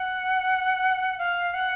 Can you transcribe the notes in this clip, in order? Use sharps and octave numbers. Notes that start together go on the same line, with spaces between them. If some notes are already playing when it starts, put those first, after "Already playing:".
Already playing: F#5
F5
F#5